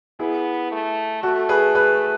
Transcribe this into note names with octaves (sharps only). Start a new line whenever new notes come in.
B3 E4 G#4
A3
A3 F#4 A4
G#4 B4
G#4 B4